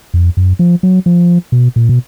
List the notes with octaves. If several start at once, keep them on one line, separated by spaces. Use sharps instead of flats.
F2
F#2
F3
F#3
F3
B2
A#2
B2